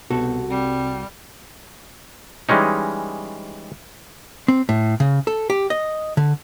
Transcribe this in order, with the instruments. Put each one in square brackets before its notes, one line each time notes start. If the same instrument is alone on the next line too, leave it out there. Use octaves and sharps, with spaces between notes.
[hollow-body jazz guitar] C2 F#4 A4 [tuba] B2
[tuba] C3 [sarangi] G3
[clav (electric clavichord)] E3 G3 G#3 C#4 D#4
[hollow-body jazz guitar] C4
A2
C#3
A4
G4
D#5
D3